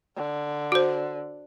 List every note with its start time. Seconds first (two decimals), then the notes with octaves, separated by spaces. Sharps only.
0.17 D3
0.72 F#4 C5